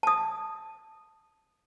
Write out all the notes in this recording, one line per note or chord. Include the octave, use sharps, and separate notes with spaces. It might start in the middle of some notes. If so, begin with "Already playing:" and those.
A5 D#6